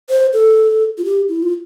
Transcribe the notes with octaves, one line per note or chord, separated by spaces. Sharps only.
C5
A4
F4
G4
E4
F4